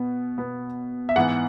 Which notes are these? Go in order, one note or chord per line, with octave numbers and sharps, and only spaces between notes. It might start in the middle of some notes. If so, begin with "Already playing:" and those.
Already playing: B2 B3
B2 B3
E5
G#2 E3 B3 F#5